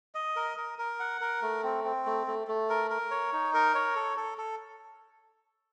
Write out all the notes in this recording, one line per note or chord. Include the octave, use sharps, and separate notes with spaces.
D#5
A#4
A#4
A#4
F#5
A#4
A3
C4
C4
A3
A3
A3
A#4
A#4
C#5
D#4
A#4
C#5
A4
A4
A4